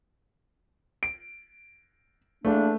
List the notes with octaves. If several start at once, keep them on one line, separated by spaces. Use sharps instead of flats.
D7
E2 A3 A#3 D4